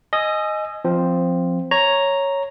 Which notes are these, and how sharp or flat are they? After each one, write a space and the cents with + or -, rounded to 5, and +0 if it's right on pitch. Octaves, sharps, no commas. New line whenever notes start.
D#5 +0 G#5 +10 E6 +30
F3 +0 C4 +0
C#5 +0 A#5 +0